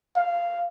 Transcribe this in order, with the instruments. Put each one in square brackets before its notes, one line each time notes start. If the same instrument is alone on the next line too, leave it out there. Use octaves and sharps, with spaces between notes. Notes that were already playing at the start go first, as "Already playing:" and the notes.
[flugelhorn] F5